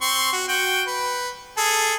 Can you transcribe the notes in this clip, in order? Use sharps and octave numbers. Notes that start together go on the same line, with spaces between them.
C4 C6 C#6
F#4
F#4 G5
B4
G#4 A4